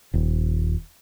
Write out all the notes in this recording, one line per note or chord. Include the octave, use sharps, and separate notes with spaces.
D#1